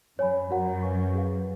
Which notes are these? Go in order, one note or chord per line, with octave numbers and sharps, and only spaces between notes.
F#2 C#5 G#5 B5
F#2 F#4 A#4 C#5 F#5 A#5
B4 F5 G#5 C#6
G#4 B4 F5